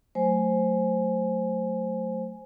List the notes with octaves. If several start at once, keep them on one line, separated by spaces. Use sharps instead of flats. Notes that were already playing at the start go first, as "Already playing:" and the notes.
F#3 A3 C5 G#5